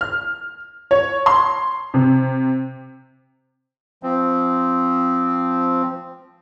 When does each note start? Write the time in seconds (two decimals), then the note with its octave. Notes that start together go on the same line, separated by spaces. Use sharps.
0.01 F6
0.91 C#5
1.26 C6
1.94 C3
4.03 F3 C4